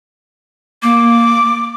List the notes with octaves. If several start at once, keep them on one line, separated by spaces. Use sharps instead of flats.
A#3 D6